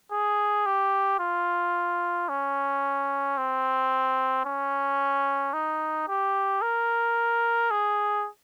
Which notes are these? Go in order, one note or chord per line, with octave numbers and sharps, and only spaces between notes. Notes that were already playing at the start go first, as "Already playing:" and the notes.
G#4
G4
F4
C#4
C4
C#4
D#4
G4
A#4
G#4